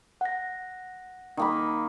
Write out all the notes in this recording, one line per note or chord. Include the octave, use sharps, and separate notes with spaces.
F#5 A#6
D#3 A#3 B5